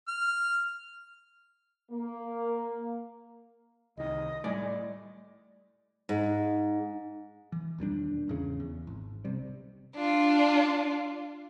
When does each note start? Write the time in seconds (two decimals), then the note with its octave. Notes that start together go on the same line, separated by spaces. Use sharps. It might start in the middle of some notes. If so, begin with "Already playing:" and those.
0.08 F6
1.91 A#3
3.97 C2 D#3 D#5
4.44 A2 G3 A3 D5 G#5
6.09 G#2
7.52 E3
7.78 E1 D#2 G3 D4
8.28 G#1 E2 C#3
8.60 E2
8.87 G#1
9.24 B1 C3 G3
9.95 D4 F4